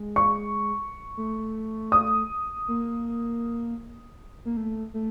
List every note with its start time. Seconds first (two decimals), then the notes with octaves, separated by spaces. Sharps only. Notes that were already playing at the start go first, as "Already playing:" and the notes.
Already playing: G#3
0.16 C#6
1.17 A3
1.92 D#6
2.68 A#3
4.45 A#3
4.57 A3
4.94 A3